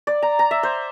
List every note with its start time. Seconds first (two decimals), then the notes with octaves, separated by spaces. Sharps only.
0.07 D5
0.22 A#5
0.39 A#5
0.51 E5
0.63 C5